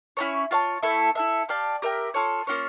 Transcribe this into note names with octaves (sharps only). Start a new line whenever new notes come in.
C#4 E4 A4 C#5
F4 C#5 F5 A5
A3 E4 A4 E5
E4 A4 E5
G4 D5 F5 A5
G4 A#4 E5 G5
F4 A4 C#5
A#3 C#4 F4 C#5